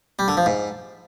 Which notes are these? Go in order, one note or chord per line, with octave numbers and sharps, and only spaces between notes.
G3
D3
F3
G#2